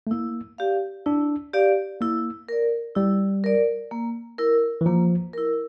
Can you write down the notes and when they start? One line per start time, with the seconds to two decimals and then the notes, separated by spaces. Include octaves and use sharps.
0.07 A3
0.11 A#3 E4
0.58 G4 D5 F5
1.06 D4 E4
1.54 G4 D5 F5
2.01 A#3 E4
2.49 A#4 D5
2.95 G3 E4
3.44 A#4 D5
3.91 A#3
4.38 E4 A#4
4.81 E3
4.86 F3 A#3
5.33 E4 A#4